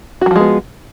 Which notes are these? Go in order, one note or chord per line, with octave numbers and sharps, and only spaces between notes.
F3 F#3 G#3 B3 F#4